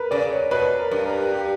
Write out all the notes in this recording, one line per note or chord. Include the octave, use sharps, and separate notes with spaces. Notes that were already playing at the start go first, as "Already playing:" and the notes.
Already playing: A#4 B4
C#3 D5
C#5
B2 B4
A#4
G2
A#4
G4